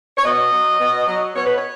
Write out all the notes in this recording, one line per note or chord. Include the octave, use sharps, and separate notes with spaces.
C#5
B2 D#5
F#3
B2
F#3
B2 C#5
B4
C#5